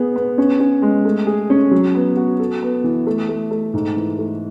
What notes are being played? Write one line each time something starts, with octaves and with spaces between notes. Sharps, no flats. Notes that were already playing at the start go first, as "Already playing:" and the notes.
Already playing: B3 G#4
B3
C#4
C#4
G#3
A3
G#4
C#4
F#3
B3
F#4
A4
B3
E3
A3
A3
A3
G#2
E3
A3